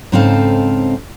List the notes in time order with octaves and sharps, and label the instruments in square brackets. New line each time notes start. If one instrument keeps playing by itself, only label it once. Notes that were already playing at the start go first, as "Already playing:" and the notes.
[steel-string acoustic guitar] G#2 C#3 C4 D#4 A4 F5